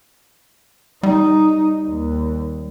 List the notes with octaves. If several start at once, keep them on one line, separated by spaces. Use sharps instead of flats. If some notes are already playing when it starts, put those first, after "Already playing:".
G3 D#4
D#2